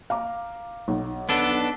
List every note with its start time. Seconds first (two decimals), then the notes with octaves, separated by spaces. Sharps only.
0.10 F5 A#5 D6
0.88 B1
1.29 B3 D4 A4